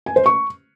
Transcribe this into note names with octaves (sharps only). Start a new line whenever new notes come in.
G#5
C5
C#6